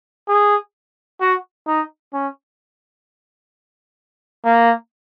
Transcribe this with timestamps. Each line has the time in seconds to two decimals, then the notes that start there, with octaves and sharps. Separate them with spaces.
0.28 G#4
1.21 F#4
1.67 D#4
2.13 C#4
4.45 A#3